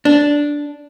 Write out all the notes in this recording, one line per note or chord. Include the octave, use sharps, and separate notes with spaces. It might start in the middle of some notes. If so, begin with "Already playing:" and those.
D4